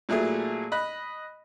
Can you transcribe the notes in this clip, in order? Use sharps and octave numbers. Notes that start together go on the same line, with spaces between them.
A#2 F#3 A3 E4 G#4
D#5 B5 F#6